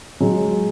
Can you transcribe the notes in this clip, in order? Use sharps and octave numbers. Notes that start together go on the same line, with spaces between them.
F#3 G#3